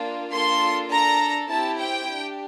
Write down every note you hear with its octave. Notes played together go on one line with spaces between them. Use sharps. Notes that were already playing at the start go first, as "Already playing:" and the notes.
Already playing: A#3 D4 F4
A#3 D4 F4 A4 C6
D4 A4 A#5
C4 E4 G4 A5
G5
D4 G4